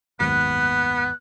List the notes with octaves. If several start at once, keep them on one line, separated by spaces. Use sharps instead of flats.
F#1 D#2 G#2 B3 F#6